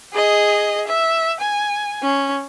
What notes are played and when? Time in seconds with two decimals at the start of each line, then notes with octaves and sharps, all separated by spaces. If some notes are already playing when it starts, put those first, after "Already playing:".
0.14 G#4 D#5
0.87 E5
1.40 G#5
2.03 C#4